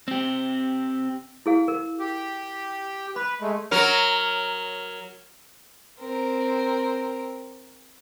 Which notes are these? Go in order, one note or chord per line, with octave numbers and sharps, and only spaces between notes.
C4 G4
E4 G#4 F5
A#4
G4
B4 B5
G#3 A3
F#3 A#4
C4 A#4